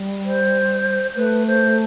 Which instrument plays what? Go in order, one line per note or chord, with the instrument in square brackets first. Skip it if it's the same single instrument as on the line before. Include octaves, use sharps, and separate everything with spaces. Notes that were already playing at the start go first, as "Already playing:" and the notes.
Already playing: [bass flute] G3
[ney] C5
[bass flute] A3 [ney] B4
[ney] C5